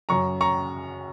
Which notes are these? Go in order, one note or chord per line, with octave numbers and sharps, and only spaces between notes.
F#2 C#3 F#3 A#5 C#6
A#5 C#6